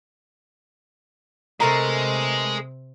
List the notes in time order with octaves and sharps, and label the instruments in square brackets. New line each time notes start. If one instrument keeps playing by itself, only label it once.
[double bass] C3 [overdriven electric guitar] G#3 [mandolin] A3 A#4 B4 [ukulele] A#5